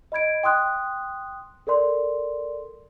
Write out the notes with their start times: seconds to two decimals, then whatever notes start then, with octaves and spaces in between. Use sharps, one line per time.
0.12 D#5 B5 G#6 D7
0.43 G5 C6 D#6 F#6
1.67 A4 A#4 D5 C6